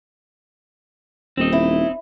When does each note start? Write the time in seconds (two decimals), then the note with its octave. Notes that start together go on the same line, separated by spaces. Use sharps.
1.37 D#1 C4 D#4
1.52 E4